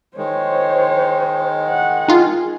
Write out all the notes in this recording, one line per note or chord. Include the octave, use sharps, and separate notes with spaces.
D#3 G#3 C5 C#5
F#5
D#4 F4 G#4